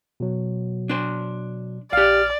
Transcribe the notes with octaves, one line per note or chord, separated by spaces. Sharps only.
B2 F#3
D4 C5
A#1 G4 D5 F5 F6